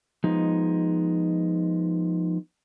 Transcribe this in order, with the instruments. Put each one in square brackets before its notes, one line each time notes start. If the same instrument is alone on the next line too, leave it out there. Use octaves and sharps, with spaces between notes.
[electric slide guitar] F3 G#3 B3 D#4